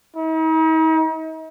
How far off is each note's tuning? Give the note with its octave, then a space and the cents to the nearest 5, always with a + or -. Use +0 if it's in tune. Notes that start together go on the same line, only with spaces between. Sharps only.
D#4 +45